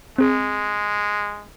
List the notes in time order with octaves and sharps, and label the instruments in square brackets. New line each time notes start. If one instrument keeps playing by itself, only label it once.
[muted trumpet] G#3 [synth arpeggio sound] C4 G#4